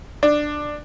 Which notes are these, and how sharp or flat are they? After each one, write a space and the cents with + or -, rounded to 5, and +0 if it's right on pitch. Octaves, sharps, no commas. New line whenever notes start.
D4 +10